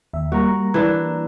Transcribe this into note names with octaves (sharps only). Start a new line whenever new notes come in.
D#2 E5
G3 A#3 F#4 A#5
E3 D4